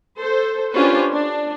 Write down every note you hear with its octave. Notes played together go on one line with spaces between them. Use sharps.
A4 C5
C#4 D4 F4 G4 B4 C5
D4